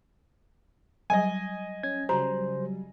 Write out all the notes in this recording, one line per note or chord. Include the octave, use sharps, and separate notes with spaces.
F#3 G3 D#5 G#5
C#4 G#6
C#3 F#3 G3 C5 A#5